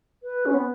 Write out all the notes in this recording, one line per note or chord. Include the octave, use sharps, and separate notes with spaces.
B4
C#4
B3